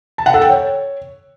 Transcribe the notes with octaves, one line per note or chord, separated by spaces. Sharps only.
A5
F#5
A4
G5
C#5